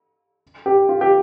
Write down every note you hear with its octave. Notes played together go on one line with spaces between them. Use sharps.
G4
F4
G4